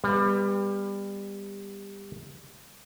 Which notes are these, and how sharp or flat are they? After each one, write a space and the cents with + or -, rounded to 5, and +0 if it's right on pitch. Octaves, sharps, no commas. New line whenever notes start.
G3 +25 B3 +0 G#5 -5